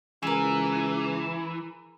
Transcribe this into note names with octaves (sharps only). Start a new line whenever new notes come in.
C#2 E3 G#4 A#4